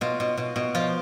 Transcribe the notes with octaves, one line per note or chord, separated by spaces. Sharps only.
B2 F4
B2
B2
B2
F3 F4